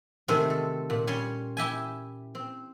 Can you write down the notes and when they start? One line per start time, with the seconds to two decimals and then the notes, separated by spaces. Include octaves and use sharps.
0.28 C3 D#3 G#3 A3 C4
0.50 A4
0.90 A#2
1.07 G3 C#4 C#5 C6
1.57 E4 G4 E5 G#5
2.35 C4